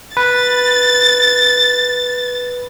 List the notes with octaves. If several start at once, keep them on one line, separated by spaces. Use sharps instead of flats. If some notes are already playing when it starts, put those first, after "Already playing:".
B4 A6